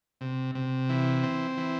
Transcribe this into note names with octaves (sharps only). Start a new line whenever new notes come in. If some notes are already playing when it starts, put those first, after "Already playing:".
C3
C3
E3
C4
E3